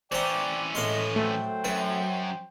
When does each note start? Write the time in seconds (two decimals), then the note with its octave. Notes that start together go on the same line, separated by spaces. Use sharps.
0.12 E3 C#4 C5 D5 G5 A#5
0.75 A2 G#3 D#5 F5 C6
1.16 F#3 A3 C5 G5
1.64 F#2 B4